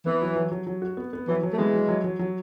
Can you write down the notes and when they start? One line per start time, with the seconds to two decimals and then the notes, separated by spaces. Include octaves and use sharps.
0.06 E3 B3
0.22 F#3
0.36 F#3
0.52 F#3
0.67 F#3
0.82 F#4
0.97 B3
1.13 B3
1.28 E3 F#3
1.43 F#3
1.53 A3
1.58 E3 G#3 B3
1.73 F#3
1.89 F#3
2.04 F#3
2.19 F#3